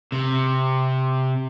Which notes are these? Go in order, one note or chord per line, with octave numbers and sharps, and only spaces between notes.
C3